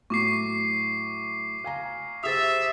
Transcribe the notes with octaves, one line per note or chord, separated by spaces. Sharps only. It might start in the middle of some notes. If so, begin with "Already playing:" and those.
A2 F#3 C#6 D6 C7
F5 G#5 A#5
G4 G#4 C5 E5 D#6 A6